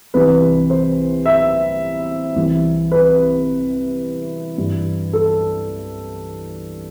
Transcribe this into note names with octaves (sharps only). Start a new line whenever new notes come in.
C2 C3 E3 B4
C5
E5
C2 C3 E3
B4
G2 E3
A4